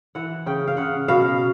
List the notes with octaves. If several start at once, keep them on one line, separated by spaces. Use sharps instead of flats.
E3 F#5
C#3 G5
F5
C#3 F#5
B2 F5